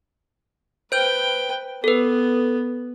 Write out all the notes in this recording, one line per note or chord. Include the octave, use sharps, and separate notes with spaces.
B4 C5 G5 G6
B3 A4 B4